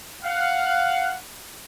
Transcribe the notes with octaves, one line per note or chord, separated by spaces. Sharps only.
F5 F#5